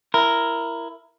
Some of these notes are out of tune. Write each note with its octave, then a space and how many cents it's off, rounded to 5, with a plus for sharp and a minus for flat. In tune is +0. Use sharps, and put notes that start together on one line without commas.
E4 +15 A#4 +0